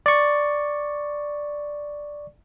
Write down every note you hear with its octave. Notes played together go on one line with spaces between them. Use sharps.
D5 C#6